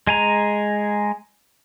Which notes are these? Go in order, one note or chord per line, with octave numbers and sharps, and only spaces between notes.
G#3 G#5 A#5